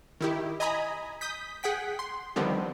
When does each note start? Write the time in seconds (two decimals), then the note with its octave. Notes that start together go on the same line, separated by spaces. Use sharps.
0.21 D#3 E4 G4
0.60 D#5 G#5 A#5 B5 D#6
1.21 D#6 G6 B6
1.63 G#4 F#5 G5 B6
1.99 C6
2.36 D3 D#3 F3 G3 B3 C4